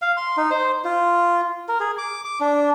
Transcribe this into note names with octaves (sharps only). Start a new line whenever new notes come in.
F5
C6
D#4
C5
F4
A#4
G#4
D6
D6
D4